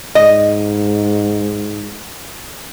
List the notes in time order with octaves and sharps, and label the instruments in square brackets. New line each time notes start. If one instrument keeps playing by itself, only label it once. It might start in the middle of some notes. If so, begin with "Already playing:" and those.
[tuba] G#2 [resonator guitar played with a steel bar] D#5